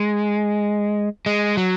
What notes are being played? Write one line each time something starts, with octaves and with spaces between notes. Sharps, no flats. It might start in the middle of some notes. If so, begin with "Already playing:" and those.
Already playing: G#3
G#3
F#3